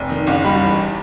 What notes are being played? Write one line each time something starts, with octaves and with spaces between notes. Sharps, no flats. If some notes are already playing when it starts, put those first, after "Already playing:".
Already playing: F1
D#3
F#1
G3 B5
E2